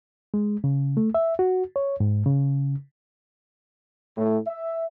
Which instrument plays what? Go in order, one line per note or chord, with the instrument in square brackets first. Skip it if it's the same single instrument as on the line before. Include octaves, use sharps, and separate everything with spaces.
[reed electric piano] G#3
C#3
A3
E5
F#4
C#5
G#2
C#3
[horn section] A2
E5